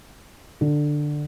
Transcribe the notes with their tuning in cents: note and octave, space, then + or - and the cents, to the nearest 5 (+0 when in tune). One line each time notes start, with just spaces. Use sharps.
D3 +10